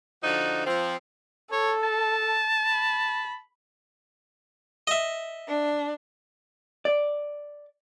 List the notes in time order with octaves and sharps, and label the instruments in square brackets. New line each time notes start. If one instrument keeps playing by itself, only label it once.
[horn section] D3 F3 D#4 F#4
F3 C4
[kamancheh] A4 [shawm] C#5
[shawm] A5
[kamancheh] B5
[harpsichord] D#5 E5
[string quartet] D4
[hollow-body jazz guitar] D5